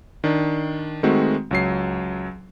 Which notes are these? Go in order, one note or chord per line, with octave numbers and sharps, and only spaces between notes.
D#3 D4
D#3 G#3 A3 C4 F#4
C#2 F#3 C7